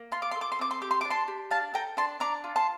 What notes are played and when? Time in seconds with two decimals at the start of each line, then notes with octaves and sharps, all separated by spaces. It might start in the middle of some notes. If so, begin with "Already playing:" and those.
Already playing: A#3
0.12 F4 C6
0.22 D6
0.31 A4 C6
0.41 D6
0.52 C6
0.59 C4 D6
0.71 C6
0.82 G4 D6
0.91 C6
1.01 D4 D6
1.10 A5 C6
1.28 G4
1.51 D4 F5 A5
1.74 A4 G5 A#5
1.97 D4 A5 C6
2.20 D4 A#5 D6
2.44 F4
2.56 A5 C6